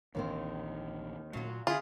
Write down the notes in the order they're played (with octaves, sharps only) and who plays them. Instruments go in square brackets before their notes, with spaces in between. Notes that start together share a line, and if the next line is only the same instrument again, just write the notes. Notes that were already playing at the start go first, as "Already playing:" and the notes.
[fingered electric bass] A#1 E3 D4 [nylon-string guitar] D#2 D#3 C4
[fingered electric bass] A#2 A3 [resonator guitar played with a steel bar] F#3 F4
[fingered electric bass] D3 C#4 [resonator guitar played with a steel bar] E4 G#4 [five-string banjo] F4